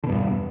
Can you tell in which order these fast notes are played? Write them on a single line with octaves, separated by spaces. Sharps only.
D3 B2 G2 E2